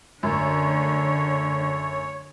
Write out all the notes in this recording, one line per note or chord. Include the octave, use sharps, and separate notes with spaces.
A1 F#2 D3 C#5